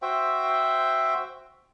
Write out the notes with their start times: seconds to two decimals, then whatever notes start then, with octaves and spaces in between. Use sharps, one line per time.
0.02 F#4 C5 E5 G5